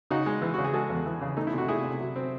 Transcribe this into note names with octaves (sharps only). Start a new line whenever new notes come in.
C#3 D#4 F#4
G#3
E3
C#3 F#4
G#4
G#3 F#4 A4
E2
E3
C#3
A3 D#4
E4
C3 F#4
A3 E4 G#4
C3
F#3
C4